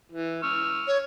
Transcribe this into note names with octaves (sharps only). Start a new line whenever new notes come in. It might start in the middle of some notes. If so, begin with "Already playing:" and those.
E3
C#6 E6 F6
C#5